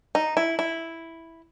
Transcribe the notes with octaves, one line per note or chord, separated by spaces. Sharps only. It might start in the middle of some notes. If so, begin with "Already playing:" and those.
D#4
E4
E4